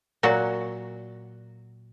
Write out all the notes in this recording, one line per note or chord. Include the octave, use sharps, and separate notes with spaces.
A#2 F#3 F#4